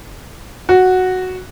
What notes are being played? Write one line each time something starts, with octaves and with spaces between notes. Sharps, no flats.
F#4